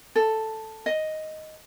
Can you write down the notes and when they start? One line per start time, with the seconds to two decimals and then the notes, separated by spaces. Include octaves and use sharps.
0.16 A4
0.86 D#5